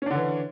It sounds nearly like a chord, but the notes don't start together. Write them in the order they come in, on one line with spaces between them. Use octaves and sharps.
C#4 D4 D3 E3